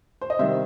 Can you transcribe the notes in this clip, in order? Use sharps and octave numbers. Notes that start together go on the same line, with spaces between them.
C5
D#5
C3 D#3 G3 C5 E5